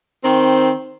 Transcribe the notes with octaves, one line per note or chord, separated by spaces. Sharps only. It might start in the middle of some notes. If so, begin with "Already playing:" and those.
D#3 C4